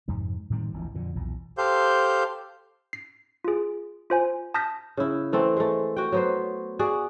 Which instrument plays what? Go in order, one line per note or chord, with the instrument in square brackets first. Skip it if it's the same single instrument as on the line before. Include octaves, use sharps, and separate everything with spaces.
[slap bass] F2 G#2 C3
A2 D#3 G3 C4
D1 A#1 F2 E3
F2 A#2 D3
B1 E2 A#2
[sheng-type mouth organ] G4 A4 C5 F5 G6
[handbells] C7
F4 G#4
F4 C5 G#5
A5 D#6 F6 G6 A#6 B6
[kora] C#3 E4
E3 A3 C4
G#3 A3
F#4 G5
F#3 B3 C5
F#4 G#4 D5